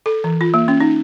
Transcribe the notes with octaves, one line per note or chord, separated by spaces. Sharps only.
A4
E3
F4
A#3
C#4
D#4